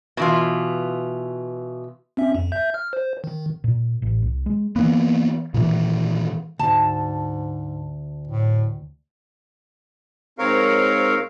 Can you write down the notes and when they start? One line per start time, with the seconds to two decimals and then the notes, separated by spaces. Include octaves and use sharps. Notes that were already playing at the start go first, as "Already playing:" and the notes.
0.17 B2 E3 F4
2.17 C4 C#4 E5
2.35 F2
2.52 E5 G6
2.74 F6
2.93 C5
3.24 D#3
3.64 A#2
4.02 A1
4.22 C2
4.46 G#3
4.76 E3 F3 A#3 B3
5.54 A#2 D#3 E3
6.59 D2 G#2 A5
8.28 A2
10.39 G#2 C4 A#4 C#5 F5